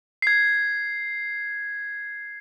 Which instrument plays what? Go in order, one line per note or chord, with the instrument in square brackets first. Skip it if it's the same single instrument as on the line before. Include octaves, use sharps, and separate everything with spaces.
[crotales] G#6 C7